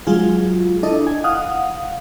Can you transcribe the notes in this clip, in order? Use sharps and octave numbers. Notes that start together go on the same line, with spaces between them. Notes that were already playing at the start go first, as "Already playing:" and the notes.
F#3 G#3 F4 G#4
D4 E4 A4 D#5
G#5
F5 F#5 D#6